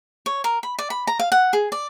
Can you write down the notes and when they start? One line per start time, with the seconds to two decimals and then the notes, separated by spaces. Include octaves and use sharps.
0.26 C#5
0.44 A#4
0.63 B5
0.79 D5
0.90 B5
1.07 A#5
1.19 F5
1.32 F#5
1.53 G#4
1.72 D5